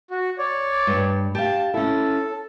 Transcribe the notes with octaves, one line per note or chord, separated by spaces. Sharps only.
F#4
C#5 D5
G2
G4 F5 A5
C#4 E4 A4